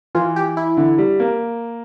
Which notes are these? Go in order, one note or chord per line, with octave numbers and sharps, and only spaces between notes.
E3 F4
G4
E4
D3
G3
A#3